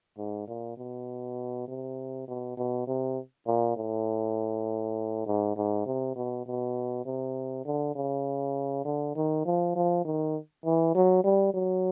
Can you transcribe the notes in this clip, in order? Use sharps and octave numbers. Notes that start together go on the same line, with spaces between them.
G#2
A#2
B2
C3
B2
B2
C3
A#2
A2
G#2
G#2
C3
B2
B2
C3
D3
C#3
D3
D#3
F3
F3
D#3
E3
F#3
G3
F#3